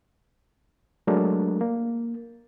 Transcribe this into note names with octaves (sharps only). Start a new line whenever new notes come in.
F#3 G#3 A3 D4 A#4
A#3